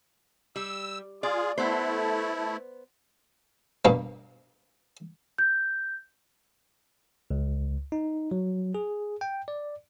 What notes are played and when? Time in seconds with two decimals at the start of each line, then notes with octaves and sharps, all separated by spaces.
0.56 G3 E6
1.23 F4 G#4 D5
1.58 A3 B3 E4 C5
3.85 G2 B2 A#3
5.38 G6
7.31 C#2
7.92 D#4
8.31 F#3
8.75 G#4
9.21 G5
9.48 D5